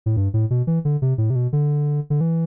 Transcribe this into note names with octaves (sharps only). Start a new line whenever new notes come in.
A2
G2
A2
B2
E3
D3
C3
A2
C3
B2
D3
D3
E3